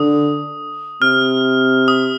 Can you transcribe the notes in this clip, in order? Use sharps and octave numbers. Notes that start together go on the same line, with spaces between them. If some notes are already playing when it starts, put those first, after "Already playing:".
Already playing: D3 D#6
C3 F6
D#6